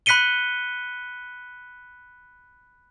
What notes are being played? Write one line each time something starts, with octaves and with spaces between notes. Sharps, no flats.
B5 F#6 B6 C#7 D#7 G7